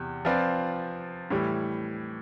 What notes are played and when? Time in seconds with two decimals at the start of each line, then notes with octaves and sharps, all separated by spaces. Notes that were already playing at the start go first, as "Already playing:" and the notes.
Already playing: E2 C3
0.25 F3 C4 F4 B4 D5
1.30 A2 E3 G3